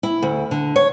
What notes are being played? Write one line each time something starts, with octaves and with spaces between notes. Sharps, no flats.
E4
D2
D3
C#5